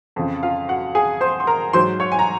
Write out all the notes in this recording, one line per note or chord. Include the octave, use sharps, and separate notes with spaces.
F2 C#3 F3
F4 F5
F#4 F#5
G#4 G#5
C5 C6
C6
A#4 A#5
G#2 F#3 C5 C6
C#5 C#6
G#5
A#5